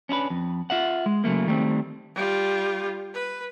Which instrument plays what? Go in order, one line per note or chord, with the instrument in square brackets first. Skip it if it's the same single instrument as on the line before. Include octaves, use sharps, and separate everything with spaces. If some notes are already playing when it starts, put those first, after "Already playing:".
[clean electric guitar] C#4 D4 E4 B4
F2
F4 E5 F#5
G#3
C#3 F#3 A3 A#3
D#3 G3 A3 A#3 C4
[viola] G3 F4
B4